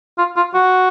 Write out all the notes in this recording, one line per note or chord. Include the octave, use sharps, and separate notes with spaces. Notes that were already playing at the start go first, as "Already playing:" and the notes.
F4
F4
F#4